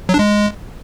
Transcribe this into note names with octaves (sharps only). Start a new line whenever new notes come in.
F#3
D4
G#3